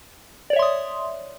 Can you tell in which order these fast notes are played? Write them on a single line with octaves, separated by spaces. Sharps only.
D5 C#5 E5 C6 D#6